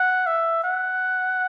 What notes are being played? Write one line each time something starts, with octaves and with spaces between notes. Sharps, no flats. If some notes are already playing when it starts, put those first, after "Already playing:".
Already playing: F#5
E5
F#5